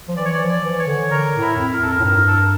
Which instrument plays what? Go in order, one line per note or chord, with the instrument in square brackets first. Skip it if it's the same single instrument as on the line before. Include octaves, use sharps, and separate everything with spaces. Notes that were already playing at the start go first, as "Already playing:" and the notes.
[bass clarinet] F3
[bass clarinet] E3 [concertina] D5
[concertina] C#5
D5
[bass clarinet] F3
[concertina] D5
[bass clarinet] E3
[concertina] C#5
[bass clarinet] D3
[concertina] A#4
[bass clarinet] A2
[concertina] E4
[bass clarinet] F2
[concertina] A#4
[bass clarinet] F2 [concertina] A4
[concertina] A#4
[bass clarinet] A2
[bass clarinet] G2 [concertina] A#4
[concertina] A4
A#4